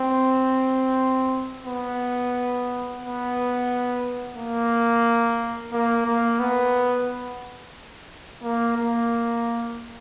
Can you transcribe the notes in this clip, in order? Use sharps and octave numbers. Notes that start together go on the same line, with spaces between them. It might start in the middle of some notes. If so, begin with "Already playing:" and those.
Already playing: C4
B3
B3
A#3
A#3
A#3
B3
A#3
A#3